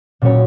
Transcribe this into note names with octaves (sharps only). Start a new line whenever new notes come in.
A#2 F#3 C#4 E4 C#5